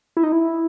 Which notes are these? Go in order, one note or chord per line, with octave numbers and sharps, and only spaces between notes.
E4
D#4
E4